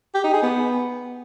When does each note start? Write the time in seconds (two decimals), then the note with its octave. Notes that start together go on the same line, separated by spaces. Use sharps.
0.15 G4
0.24 D#4
0.33 G#4
0.43 B3